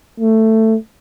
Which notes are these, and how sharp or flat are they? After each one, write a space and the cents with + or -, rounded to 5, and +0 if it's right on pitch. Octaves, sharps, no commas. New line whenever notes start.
A3 +10